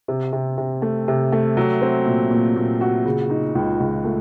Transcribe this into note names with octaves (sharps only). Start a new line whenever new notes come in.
C3
C3
C3
A3
C3
A3
F#3
C4
A#2
A#2
A#2
F#4
C#3
D#4
C#2
C#2
A3